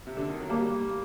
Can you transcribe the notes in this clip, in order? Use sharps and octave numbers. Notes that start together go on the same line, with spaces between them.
C3
D3
D#3
F#3
G3 A#3